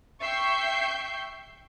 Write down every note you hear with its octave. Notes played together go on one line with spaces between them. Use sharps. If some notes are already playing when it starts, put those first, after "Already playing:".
E5 G5 C#6 G6 C7